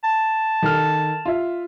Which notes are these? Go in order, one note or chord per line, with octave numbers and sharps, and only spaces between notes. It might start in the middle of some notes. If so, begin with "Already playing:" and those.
A5
D#3 A4 F6
F4 E5